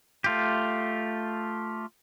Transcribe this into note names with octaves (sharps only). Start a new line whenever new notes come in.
A3 F4 G4